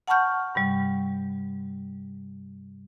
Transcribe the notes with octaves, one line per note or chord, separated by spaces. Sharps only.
F#5 A5 B5 C#6 F6 G6
G2 C3 G3